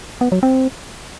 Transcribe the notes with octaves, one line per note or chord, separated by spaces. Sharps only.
B3
F#3
C4